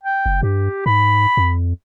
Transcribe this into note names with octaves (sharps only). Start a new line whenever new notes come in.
G5
F#1
G2 G4
G#2 B5
F2